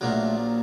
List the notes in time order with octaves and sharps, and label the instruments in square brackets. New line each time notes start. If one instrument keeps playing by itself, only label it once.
[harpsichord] A#1 A#2 F#3 [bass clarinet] A3
[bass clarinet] A#3